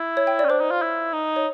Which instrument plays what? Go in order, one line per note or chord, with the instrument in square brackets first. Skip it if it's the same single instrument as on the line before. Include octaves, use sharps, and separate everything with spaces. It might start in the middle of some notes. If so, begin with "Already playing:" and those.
Already playing: [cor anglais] E4
[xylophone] C#5
G5
D5
[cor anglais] C#4
[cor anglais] D4 [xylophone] C5
[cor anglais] D#4
F4
E4
D#4
[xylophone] C#5